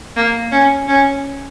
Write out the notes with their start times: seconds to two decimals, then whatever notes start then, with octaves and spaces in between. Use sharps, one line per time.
0.16 A#3
0.52 C#4
0.88 C#4